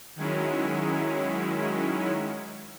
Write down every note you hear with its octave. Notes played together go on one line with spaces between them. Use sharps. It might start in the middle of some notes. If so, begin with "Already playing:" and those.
D#3 F#3 G#3 C#4 E4